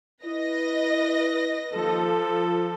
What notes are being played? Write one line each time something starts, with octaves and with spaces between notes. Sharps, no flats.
E4 B4 D#5 A#6
D#2 F3 A4
F4